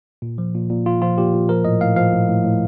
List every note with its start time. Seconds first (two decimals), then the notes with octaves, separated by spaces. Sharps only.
0.22 A#2
0.38 F3
0.55 A#2
0.70 A#2
0.86 F3 F4
1.02 F3 F4
1.18 A#2 G4
1.34 A#2
1.49 F3 A#4
1.65 A2 D#5
1.81 A2 F5
1.96 F3 F5
2.12 A2
2.29 A2
2.44 A2